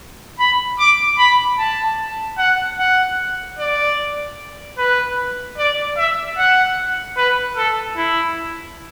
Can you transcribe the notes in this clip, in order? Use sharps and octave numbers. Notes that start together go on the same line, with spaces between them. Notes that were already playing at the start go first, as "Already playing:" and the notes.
B5
D6
B5
A5
F#5
F#5
D5
B4
D5
E5
F#5
B4
A4
E4